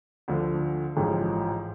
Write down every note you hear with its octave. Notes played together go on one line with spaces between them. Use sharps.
D2 D3 F3
A1 G#2 F3